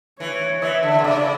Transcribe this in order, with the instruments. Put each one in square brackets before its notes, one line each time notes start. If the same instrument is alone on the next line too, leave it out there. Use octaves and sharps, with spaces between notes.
[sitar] E3 [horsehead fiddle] C#5
[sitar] E3 [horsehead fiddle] E5
[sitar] D3
B2
[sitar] C#3 [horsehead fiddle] D5